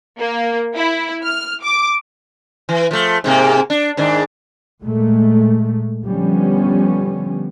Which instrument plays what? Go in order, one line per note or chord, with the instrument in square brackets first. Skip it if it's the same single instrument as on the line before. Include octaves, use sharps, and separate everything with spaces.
[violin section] A#3
E4
F6
D6
[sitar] E3
F3 A3
G#2 C3 A#3
D4
G#2 D#3 D4
[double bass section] A#2 G#3 A3
D3 F3 G3 B3 C#4